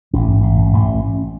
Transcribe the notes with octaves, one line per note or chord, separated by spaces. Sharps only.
A1 C#4
G#2
A1
G#2
A1